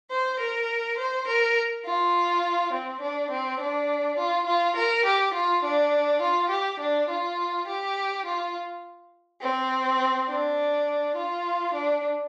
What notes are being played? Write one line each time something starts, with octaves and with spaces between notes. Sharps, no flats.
C5
A#4
C5
A#4
F4
C4
D4
C4
D4
F4
F4
A#4
G4
F4
D4
F4
G4
D4
F4
G4
F4
C4
D4
F4
D4